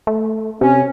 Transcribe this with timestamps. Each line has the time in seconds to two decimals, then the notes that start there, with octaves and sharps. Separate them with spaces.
0.07 A3
0.61 C3 C#4